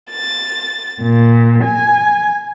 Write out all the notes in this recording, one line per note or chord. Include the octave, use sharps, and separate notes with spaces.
A6
A#2
G#5